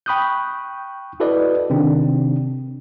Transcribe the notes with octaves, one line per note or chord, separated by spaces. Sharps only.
G5 B5 C#6 D#6 F#6 G6
E4 F#4 A4 B4 D5 D#5
C3 D#3 C4 D4